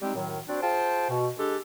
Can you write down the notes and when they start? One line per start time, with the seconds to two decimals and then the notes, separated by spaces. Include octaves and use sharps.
0.02 G3 G#3 C4 D#4 G4
0.15 F#2 A2 D#3 F#3
0.48 C4 D4 F#4 C5 D5
0.62 F4 G#4 C5 G5 A5
1.09 B2
1.38 G#3 D4 G4 A4